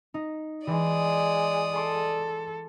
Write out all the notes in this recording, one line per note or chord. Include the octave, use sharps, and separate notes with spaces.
D#4
E3 G#3 D5 D#6
A4 C6 D6